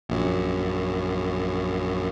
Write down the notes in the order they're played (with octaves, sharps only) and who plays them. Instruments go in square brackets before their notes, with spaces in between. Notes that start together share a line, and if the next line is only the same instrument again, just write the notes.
[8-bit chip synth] A#1 F#2